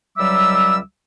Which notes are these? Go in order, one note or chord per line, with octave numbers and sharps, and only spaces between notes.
C#2 F#3 G3 E5 D6 E6